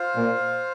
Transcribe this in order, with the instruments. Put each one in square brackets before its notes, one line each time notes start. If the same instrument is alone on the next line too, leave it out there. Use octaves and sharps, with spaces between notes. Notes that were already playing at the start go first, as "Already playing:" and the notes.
Already playing: [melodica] F4 C5 F5
[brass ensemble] A#2